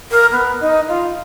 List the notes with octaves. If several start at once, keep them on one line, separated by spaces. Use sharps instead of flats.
A#4
B3
D#4
F4